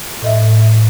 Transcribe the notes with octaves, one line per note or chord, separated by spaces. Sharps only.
A2 D#5 E5